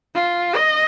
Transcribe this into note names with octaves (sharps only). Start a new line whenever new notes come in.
F4
D#5